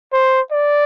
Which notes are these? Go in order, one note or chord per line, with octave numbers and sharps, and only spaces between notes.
C5
D5